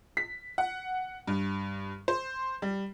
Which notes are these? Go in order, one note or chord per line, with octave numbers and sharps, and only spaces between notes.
B6
F#5
G2
C5
G3